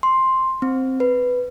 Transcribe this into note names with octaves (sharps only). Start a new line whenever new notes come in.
C6
C4
B4